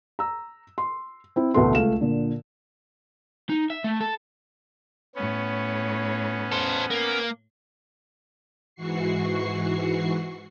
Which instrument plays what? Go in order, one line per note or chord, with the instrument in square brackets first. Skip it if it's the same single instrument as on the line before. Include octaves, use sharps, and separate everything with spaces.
[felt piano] A#5 E6
C6
C4 E4
A1 D2 B2 A3 B4 C6
C#2 A3 F5 E7
A#2 D3
[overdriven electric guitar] D#4
E5
A3
A4
[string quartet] A2 C#5 [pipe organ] B3 C#4
[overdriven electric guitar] A4 C5
A#3
[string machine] G#2 E3 F#4 C#6 C7